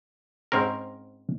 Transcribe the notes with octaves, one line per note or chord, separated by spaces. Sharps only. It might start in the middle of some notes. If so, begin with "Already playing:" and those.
G#2 C4 C#4 A#4